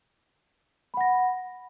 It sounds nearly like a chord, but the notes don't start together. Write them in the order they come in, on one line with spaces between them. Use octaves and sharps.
B5 F#5 A#6